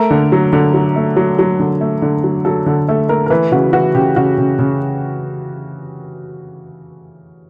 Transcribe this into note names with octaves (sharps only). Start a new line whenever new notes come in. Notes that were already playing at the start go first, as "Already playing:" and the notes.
Already playing: A3 A#4
D3
F#3
D3
F#3
A3
F#3
F#3
D3
A3
D3
F#3
F#3 A4
D3 A4
A3 A4
A3 A#4
A#4
E3 B4
C#3 F#4
E3 F#4
C#3 G4
C#3 F#4
C#3
C#3